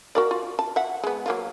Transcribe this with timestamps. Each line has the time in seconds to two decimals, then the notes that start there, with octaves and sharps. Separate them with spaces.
0.15 F#4 A#4 D5
0.31 F4
0.59 A5
0.76 E5 F#5
1.04 G#3 B3
1.26 F#3 A#3 F4